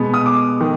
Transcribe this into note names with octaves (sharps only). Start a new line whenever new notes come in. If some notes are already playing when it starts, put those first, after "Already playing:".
Already playing: B2 G#3 B3
D#6
D6
D#3